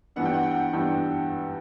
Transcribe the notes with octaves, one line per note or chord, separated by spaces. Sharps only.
G2 E3 B3 D4 F#5
G5
F#5
G5
F#5
G2 E3 B3 D4 G5